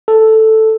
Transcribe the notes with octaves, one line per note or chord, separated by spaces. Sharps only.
A4